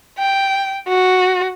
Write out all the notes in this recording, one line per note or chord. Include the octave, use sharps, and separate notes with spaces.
G5
F#4